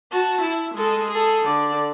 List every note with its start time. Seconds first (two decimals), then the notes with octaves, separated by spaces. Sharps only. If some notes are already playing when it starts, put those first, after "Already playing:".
0.11 F#4 A5
0.41 E4
0.75 G#3 A4
1.10 G#4 A4
1.42 D3 D5